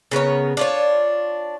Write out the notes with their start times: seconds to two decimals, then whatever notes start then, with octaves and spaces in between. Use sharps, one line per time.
0.11 C#3 B3 A#4 C#5
0.57 D4 F4 C#5